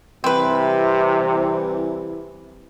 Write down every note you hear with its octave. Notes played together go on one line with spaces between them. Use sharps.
C2 C3 E3 C4 B4